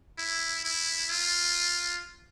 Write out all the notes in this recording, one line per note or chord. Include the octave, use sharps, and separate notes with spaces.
E4
E4
F4